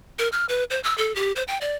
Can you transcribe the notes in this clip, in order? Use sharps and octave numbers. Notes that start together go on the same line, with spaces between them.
A#4
F6
B4
C5
E6
A4
G4
C5
G5
D5